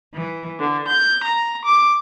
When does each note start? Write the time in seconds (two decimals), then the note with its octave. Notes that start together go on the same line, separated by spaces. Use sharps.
0.13 E3
0.60 D3
0.89 G6
1.24 A#5
1.65 D6